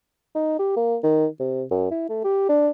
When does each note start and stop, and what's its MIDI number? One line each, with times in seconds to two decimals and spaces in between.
0.35 0.56 63
0.59 0.74 67
0.77 0.97 58
1.04 1.27 51
1.40 1.63 48
1.71 1.89 42
1.91 2.07 64
2.09 2.23 57
2.24 2.48 67
2.49 2.70 62